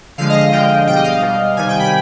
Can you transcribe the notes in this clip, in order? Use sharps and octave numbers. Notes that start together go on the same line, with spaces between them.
D3 F3 G#3 F5
D#5
D#5
D3 F3 G#3 G5
B2 G3 G5
D#5
F5
B2 G3
C3 D#3 G3 G#5
G5
B5